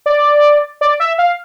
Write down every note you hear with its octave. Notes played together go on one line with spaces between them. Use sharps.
D5
D5
E5
F5